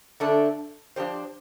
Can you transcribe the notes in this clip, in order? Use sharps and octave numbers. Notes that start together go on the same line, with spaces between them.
D3 A3 D4 A4
F3 D4 G4 C5